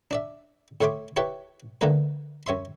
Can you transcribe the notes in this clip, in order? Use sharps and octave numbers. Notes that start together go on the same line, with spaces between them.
D4 D5 E5
A2 A3 C#5 E5 C6 D6
E4 G4 B4 C#5 E5 A5
D3 E3 A3 A#3 D#4 B4
F#2 C#5 E5 C6